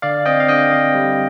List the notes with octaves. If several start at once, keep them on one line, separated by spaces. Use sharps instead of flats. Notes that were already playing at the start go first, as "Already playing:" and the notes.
D3 D5 F5
C4 D#5 G5
F5
D3 D#5 G5
C4
G3